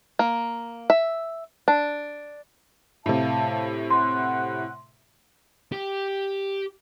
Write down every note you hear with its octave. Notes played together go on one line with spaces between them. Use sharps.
A#3
E5
D4
A2 C3 E5 F5 A5
F#5 C6 F#6
G4